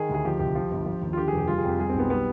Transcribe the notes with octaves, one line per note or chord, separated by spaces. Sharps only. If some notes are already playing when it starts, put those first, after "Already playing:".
Already playing: D#3 G#4
D2
G#4
F3 G4
C2 G4
F3
G1
F3
D#2
F4
D3 G4
F1 G#4
G4
G3 F4
G#4
F2 G4
G3 G#4
B1 C4
B3
G3 B3